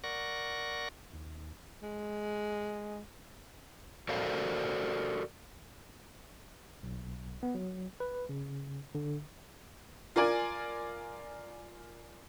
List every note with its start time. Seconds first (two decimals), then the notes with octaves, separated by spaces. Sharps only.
0.04 A#4 D5 F#5 C#6 A#6
1.13 D#2
1.83 G#3
4.09 F#4 A4 A#4 C5 D5 F5
6.83 B1
7.43 B3
7.55 F#3
8.00 B4
8.29 C#3
8.95 D3
10.16 F4 A#4 D5 G#5